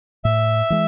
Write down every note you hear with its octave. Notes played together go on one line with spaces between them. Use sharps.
A2 E5
E3 G#3